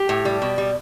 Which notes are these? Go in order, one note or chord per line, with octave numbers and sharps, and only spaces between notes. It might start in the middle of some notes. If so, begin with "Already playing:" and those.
Already playing: G4
A2
G3
B2
G3